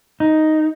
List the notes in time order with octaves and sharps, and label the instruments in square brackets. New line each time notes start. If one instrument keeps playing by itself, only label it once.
[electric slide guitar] D#4